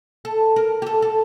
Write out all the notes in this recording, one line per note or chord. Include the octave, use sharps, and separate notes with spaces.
A4
A#4
G4
A4
A4